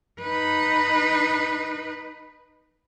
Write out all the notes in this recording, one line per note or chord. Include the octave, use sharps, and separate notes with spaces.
D#4 B4